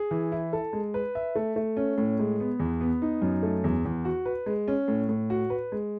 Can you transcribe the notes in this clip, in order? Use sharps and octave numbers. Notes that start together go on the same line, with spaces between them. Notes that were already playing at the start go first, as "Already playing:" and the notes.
Already playing: G#4
E3
E4
A4
G#3
B4
E5
A3
A3
C#4
A2
G#3
B3
E2
B3
D#4
F#2
A3
E2
E2
F#4
B4
G#3
C#4
A2
A2
F#4
B4
G#3